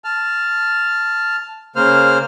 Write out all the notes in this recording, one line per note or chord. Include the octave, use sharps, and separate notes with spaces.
A5 F6
C#3 A#3 C5 F6